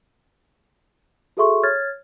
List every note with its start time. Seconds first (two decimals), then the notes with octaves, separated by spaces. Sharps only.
1.37 F#4 G#4 A4 E5 C6 C#6
1.63 C#5 F6 G#6 A6